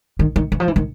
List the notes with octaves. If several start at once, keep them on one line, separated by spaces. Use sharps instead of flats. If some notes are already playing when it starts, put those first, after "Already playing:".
D#3
D#3
E3
F3
E3
D#3